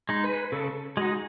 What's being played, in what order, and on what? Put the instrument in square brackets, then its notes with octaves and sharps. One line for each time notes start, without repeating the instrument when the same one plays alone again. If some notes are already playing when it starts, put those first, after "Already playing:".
[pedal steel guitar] G#3 D#4
[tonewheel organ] B4
[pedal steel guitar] C#3 [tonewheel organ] A4
[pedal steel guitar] G#3 D#4 [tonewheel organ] F#4